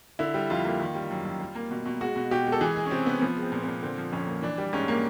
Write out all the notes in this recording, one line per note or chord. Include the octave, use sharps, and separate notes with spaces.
D3 E4
G3
F2 F4
A#3
D#3
G3
F#2
F#2
G3
A#3
B2
B2
G#3 F#4
B2
B2 G4
G#3
A4
E3 G#4
G#3
C#4
C3 C4
C3 B3
F3 B3
G#3
C4
A#2
B3
A#2
D3 C4
F3
F2 C#4
A#3
E3 D4
G3
G#2 C#4
A#3